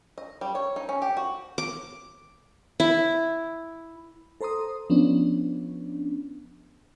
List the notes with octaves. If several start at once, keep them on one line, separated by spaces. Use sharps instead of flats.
D#5
G3
C#5
D#4
C#4
G4
F#4
D6
E4
A4 C5 A#5 C6 D#6
F3 B3 C#4 D4